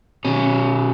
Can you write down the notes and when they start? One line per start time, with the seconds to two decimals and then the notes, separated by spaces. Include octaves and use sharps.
0.25 B2 C#4